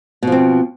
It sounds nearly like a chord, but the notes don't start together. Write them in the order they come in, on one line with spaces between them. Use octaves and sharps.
B2 F3 C4